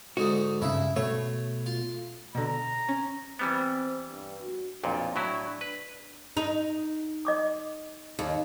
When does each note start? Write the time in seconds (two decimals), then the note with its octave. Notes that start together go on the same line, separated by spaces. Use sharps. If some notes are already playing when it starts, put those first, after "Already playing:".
0.17 G#2 D3 D#4 F#4
0.62 G2 C#3 E4 E5
0.96 B2 A3 C#5
1.66 F4
2.35 B2 D3 A#5
2.88 C#4
3.39 E3 G3 B3 C4
4.09 G2
4.41 F#4
4.84 B1 F2 A#2 D4
5.16 A2 F#3 E4
5.61 B4
6.37 D#4
7.25 D#5 D6 D#6
8.19 D#2